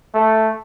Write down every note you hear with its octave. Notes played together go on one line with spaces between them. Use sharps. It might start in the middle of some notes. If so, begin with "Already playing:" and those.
A3